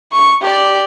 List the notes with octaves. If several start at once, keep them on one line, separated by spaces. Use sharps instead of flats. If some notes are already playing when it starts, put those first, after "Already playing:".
C#6
G4 D5